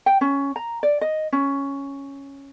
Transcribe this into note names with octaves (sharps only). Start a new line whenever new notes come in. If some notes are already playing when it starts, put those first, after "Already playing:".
G5
C#4
A#5
D5
D#5
C#4